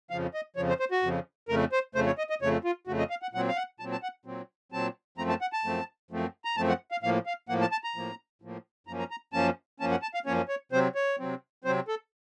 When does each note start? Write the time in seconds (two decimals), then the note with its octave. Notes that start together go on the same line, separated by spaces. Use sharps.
0.10 F2 C#3 F3 F5
0.34 D#5
0.56 F2 C#3 F3 C#5
0.69 C5
0.80 C5
0.92 F#4
1.02 F2 C#3 F3
1.48 F2 C#3 A3 A#4
1.72 C5
1.95 F2 C#3 A3 C5
2.06 C#5
2.18 D#5
2.30 D#5
2.42 F2 C#3 A3 C#5
2.64 F4
2.87 F2 C#3 A3 F#4
2.99 D#5
3.10 F5
3.22 F#5
3.33 A#2 F#3 C4 F#5
3.48 F5
3.56 F#5
3.80 A#2 F#3 C4 A5
3.92 A5
4.03 F#5
4.25 A#2 F#3 C4
4.72 A#2 F#3 C4 A5
5.18 F#2 F3 A3 C4 A#5
5.29 A5
5.41 F#5
5.53 A5
5.64 F#2 F3 A3 C4
6.11 F#2 F3 A3 C4
6.45 A#5
6.57 F#2 F3 A3 C4 A5
6.68 F#5
6.91 F5
7.03 A2 F3 A#3 F5
7.26 F5
7.49 A2 F3 A#3 F#5
7.61 A5
7.72 A5
7.84 A#5
7.96 A2 F3 A#3
8.42 A2 F3 A#3
8.87 F#2 F3 A#3 C#4 A#5
8.99 A#5
9.11 A#5
9.33 F#2 F3 A#3 C#4 A5
9.80 F#2 F3 A#3 C#4 A5
9.91 F#5
10.02 A5
10.14 F5
10.26 F#2 F3 A#3 C#4 C#5
10.48 C#5
10.72 C3 F#3 C4 C5
10.95 C#5
11.19 C3 F#3 C4
11.64 C3 F#3 C4 C5
11.88 A4